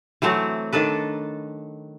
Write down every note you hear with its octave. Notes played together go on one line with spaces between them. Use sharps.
E3 F#3 A3 C4
D#3 D4 A4 B4